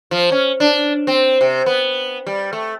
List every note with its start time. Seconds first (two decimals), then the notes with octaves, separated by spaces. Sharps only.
0.11 F3
0.32 C#4
0.60 D4
1.07 C4
1.41 C3
1.66 B3
2.26 G3
2.53 A3